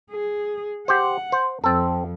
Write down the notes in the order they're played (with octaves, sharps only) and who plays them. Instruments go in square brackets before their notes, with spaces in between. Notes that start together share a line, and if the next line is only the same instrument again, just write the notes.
[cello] G#4
[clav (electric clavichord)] G4 C5 [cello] F#5
[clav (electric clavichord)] C5
[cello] F2 [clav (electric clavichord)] C4 A4